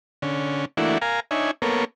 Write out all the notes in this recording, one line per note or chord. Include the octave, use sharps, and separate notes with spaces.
D3 C#4
E3 A3 A#3 D4 E4 F#4
A#4 F5 G#5 A#5
D4 D#4 C#5 E5 G#5
A#3 B3 A4 A#4 C#5